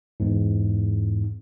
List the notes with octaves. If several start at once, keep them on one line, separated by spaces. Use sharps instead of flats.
E2 G#2